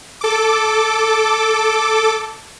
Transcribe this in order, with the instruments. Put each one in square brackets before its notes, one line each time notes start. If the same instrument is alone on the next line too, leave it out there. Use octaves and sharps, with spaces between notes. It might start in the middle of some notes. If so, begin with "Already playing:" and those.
[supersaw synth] A4 D6